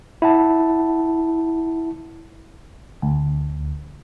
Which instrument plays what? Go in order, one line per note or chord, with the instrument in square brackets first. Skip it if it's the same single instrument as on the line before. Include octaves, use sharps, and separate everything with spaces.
[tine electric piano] E4 F#5 A5
[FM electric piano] D2